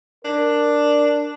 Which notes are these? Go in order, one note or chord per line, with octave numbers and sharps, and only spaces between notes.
D4 A#4